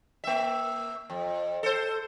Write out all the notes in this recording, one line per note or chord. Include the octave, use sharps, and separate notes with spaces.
A#3 E5
F2
A4 C5